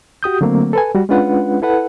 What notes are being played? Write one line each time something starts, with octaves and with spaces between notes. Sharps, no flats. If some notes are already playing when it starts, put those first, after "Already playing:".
F#4 G4 D#6 G6
D3 F#3 A3 A#3 C4
A4 B4 G#5
G3 F#4
G#3 C#4 D4 F4 B4 F#5
E4 A4 B4 F#5